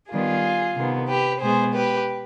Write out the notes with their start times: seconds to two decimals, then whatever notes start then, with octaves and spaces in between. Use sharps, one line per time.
0.11 D#3 G3 B3 F4 G#4
0.76 C3 D#3 B3
1.08 G4 B4
1.41 B2 G#3 B3 G#4 C5
1.74 G4 B4